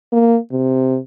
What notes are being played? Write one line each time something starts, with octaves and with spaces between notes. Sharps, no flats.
A#3
C3